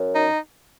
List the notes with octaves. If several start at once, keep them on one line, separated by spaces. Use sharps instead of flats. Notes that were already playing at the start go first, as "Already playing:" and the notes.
Already playing: F#2
D#4